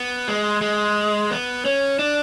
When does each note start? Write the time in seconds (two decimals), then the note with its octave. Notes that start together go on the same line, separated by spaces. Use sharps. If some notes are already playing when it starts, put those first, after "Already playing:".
Already playing: B3
0.28 G#3
0.61 G#3
1.31 B3
1.65 C#4
1.99 D4